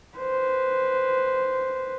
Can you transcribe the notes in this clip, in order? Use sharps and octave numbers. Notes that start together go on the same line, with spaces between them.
B4 C5